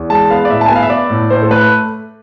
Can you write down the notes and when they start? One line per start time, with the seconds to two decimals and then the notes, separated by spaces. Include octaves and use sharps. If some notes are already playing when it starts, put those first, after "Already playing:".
Already playing: E2
0.10 G#3 A5
0.30 B3 F5
0.45 D5
0.50 A2 E5
0.61 A5
0.68 B3 G#5
0.76 F5
0.83 E5
0.90 B3 D5
1.10 A2
1.30 A2 C5
1.42 A4
1.50 A3 B4